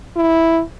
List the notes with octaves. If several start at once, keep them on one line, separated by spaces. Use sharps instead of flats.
E4